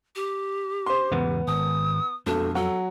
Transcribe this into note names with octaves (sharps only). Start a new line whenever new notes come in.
G4
C5 C6
E2 G#2 C#3 B3
G#1 D#6
E1 F2 A3 D4
F#3 A4